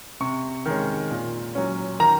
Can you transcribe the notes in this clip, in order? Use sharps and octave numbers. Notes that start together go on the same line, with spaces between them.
C3 C#6
D#3 G#3 C#4
A#2
F#3 C#4
D#3 A#5